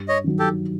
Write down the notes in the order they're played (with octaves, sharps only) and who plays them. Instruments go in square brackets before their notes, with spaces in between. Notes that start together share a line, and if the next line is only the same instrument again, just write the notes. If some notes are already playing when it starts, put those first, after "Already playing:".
Already playing: [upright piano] G2
[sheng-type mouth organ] C#5 D#5
[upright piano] D#3 F#3
[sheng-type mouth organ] G4 A4